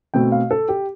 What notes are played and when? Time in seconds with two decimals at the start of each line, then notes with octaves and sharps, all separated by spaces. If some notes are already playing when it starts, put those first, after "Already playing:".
0.14 B2 A3 C4 G5
0.32 F5
0.51 A4
0.69 G4